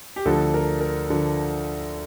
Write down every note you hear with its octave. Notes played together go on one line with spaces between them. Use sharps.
G4
D2 D3 F3 A4
A#4
A#4
D3 F3